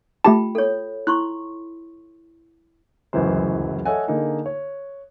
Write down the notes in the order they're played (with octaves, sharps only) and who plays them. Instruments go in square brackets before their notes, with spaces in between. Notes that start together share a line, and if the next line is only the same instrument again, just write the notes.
[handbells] A3 G4 A5 [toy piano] F4 G5 B5
[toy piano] A4 C#5
[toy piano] E4 C6 C#6 [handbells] F#6
[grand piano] D1 C#2 F#2 E3 F#3 C5
A4 C#5 D#5 E5 F#5 G#5
D3 A#3 D#4 G#4
C#5